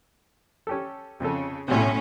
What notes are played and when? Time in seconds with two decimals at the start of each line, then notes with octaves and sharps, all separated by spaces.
0.67 C#4 G4 A4
1.20 F2 C#3 A4
1.68 B1 A2 C3 C#4